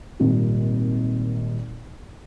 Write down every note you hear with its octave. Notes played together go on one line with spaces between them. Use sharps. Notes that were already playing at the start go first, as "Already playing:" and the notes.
G#1 A#2 G3